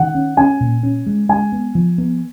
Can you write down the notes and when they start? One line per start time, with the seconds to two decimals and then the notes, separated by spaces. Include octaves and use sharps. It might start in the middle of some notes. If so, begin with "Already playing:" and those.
Already playing: D#3 F#5
0.15 C#4
0.37 C#4 G#5
0.60 A#2
0.83 C#4
1.06 G#3
1.29 G#3 G#5
1.52 B3
1.75 F3
1.98 B3